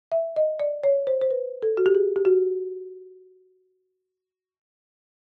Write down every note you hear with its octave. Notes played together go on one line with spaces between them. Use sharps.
E5
D#5
D5
C#5
C5
C5
B4
A4
F#4
G4
G#4
G4
F#4